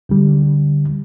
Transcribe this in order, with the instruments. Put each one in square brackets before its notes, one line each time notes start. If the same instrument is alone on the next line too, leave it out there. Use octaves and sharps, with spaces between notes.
[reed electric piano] D2 D3 G3